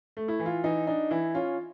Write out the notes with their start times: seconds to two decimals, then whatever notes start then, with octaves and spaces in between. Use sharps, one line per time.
0.17 A3
0.28 E4
0.40 E3
0.46 F4
0.64 E3 D#4
0.87 D4 D#4
1.11 E3 E4
1.35 C#4 F4